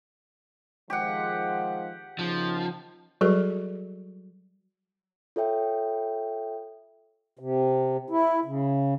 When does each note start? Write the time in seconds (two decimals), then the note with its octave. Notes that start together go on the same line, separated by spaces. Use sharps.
0.90 D#3 F3 G#3 G4 F#5
2.19 C#3 F3 A#3 D#4
3.21 F#3 G3 F#4 G#4 A4 B4
5.36 F4 A4 C#5 E5 G5
7.39 C3
8.10 E4
8.45 C#3